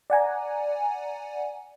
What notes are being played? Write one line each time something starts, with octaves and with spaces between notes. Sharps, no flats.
D5 F#5 G#5 A#5